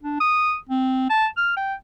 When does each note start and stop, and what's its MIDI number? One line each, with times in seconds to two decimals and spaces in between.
0.03 0.17 62
0.20 0.56 87
0.69 1.08 60
1.10 1.26 81
1.37 1.53 89
1.57 1.75 79